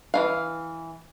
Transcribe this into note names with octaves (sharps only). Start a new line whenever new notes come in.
E3 D#4 F5